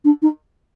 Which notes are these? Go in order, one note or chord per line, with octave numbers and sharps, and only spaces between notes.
D4
D#4